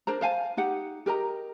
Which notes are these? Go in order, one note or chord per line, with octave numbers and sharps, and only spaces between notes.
D4 A#4 C5 A#5
C5 F5 G#5 A5
D#4 G4 F#5
G4 A#4 D#5 A#5